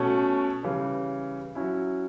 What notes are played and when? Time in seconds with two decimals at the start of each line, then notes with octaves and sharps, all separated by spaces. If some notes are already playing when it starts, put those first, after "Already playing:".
Already playing: B2 A3 C#4
0.63 C#3 E3 G3
1.55 F#3 C#4 E4